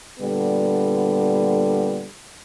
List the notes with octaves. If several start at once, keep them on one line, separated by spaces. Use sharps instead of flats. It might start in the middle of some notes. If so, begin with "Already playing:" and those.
A#2 D3 G3 B3